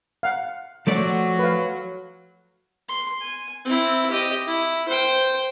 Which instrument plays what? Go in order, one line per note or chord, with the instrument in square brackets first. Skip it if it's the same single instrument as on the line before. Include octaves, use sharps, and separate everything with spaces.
[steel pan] F5 F#5
[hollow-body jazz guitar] F3 A3 D5 [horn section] F#3
[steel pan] B4 F5
[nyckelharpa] C6
G#5
C4 E4
G4 D#5
E4
C5 G5